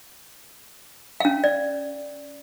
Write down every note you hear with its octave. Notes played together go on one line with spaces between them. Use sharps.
C#4 F5
D5